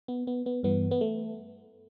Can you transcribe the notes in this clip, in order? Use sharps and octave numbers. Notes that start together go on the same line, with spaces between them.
B3
B3
B3
G2 E3 B3
B3
A3